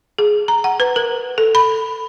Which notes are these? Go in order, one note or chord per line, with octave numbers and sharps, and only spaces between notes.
G#4
A#5
F#5
B4
A#4
A4
B5